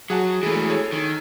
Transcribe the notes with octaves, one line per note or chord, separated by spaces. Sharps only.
F#3 G#4 F#5 A5
E3 G#3 A3 G#4
G#4 A4 C#5
D#3